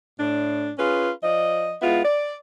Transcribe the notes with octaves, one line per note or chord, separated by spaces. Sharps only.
A2 D4
C#4 F4 G#4 B4
F3 D5 D#5
G#3 B3 E4 F4
D5